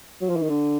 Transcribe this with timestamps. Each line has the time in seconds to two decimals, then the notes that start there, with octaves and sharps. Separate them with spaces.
0.21 F#3
0.29 F3
0.36 E3
0.42 D#3
0.49 D3